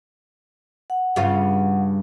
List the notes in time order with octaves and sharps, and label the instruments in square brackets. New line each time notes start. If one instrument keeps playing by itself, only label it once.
[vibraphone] F#5
[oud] G2 C#3 F4